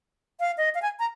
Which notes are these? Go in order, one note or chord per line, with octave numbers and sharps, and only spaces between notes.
F5
D#5
F5
G#5
A#5